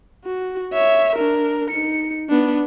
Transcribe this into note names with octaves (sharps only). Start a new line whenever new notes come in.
F#4
C#5 E5
D4 A#4
D#4 C#7
B3 D4